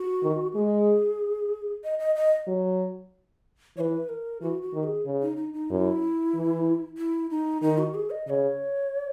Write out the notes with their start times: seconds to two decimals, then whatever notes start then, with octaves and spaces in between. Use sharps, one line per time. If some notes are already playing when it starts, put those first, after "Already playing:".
Already playing: F#4
0.23 D#3
0.54 G#3 G#4
1.84 D#5
1.99 D#5
2.16 D#5
2.47 F#3
3.77 E3 C#5
3.81 B4
4.09 A#4
4.41 E3 F#4
4.62 F#4
4.73 D#3
4.84 G#4
5.05 C#3
5.22 D#4
5.37 D#4
5.53 D#4
5.70 F#2 E4
6.34 E3
6.98 E4
7.31 D#4
7.62 D#3 D#4
7.78 F#4
7.94 G#4
8.10 D#5
8.26 C#3 C#5 D#5